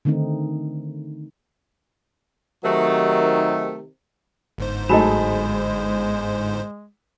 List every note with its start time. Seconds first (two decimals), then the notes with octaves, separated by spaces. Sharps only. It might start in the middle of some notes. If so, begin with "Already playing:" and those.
0.05 D3 D#3 A3 C4 D#4
2.64 C3 D#3 F#3 A3
4.58 G1 G#2 C5
4.89 F#3 G#3 A3 D#4 G#4 B5 E7